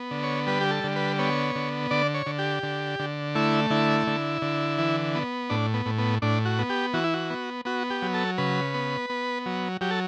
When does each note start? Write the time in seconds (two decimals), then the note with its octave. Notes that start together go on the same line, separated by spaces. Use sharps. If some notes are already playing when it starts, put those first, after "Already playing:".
Already playing: B3
0.11 D3
0.23 C#5
0.47 G3 B4
0.61 G4
0.71 A4
0.84 D3
0.96 B4
1.19 B3 C#5
1.55 D3
1.91 D3 D5
2.14 C#5
2.26 D3
2.39 G4
2.63 D3
2.99 D3
3.35 A3 E4
3.70 D3 E4
4.07 D3
4.42 D3
4.78 E3
5.15 B3
5.50 A2 D4
5.74 B3
5.86 A2
5.98 B3
6.22 A2 D4
6.45 F#4
6.59 B3
6.69 G4
6.93 E3 F#4
7.04 E4
7.14 F#4
7.30 B3
7.65 B3 F#4
7.90 G4
8.02 F#3
8.14 A4
8.38 C#3 B4
8.74 B3
9.10 B3
9.46 F#3
9.81 F#3 G4
9.91 A4